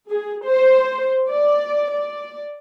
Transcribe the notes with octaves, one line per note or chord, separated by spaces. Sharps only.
G#4
C5
D5
D5